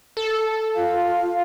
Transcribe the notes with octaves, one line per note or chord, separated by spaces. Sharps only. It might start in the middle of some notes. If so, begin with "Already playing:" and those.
A4
F4 F5